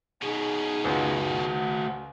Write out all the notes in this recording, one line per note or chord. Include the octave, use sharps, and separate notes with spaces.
B2 C#4 D#4 G#4
C#2 F#4 C5